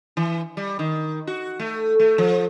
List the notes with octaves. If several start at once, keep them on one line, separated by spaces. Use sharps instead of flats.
E3
G3
D#3
F#4
A3
A3
F3